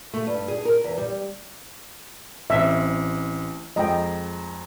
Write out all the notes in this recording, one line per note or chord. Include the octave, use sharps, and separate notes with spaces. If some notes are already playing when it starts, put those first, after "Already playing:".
A3
G2
G#4
A#4
E2
G3
A1 C4 E5
F2 G#3 D#5 G5 A#5